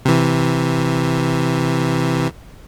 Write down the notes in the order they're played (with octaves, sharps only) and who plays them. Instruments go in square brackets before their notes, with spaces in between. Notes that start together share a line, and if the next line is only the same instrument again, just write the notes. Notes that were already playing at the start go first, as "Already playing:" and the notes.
[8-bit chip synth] C3 E3